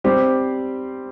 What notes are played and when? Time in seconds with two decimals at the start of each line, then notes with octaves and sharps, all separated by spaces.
0.04 G3 C4 G4 C5